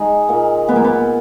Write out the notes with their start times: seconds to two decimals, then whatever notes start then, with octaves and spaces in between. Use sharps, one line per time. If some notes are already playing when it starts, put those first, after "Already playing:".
Already playing: G#3 D#4
0.29 A#2
0.68 A#2 B3
0.76 A#3
0.84 B3